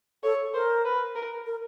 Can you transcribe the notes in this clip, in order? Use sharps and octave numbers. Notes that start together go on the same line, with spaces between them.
A4 C#5
A#4 C5
B4
A#4
A#4